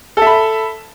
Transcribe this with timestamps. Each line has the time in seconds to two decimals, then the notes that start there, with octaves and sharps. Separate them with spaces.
0.17 A4
0.22 E5
0.27 B5